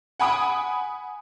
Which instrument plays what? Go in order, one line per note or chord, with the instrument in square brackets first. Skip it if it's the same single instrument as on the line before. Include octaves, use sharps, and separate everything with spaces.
[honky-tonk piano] F#5 G#5 B5 D#6 D7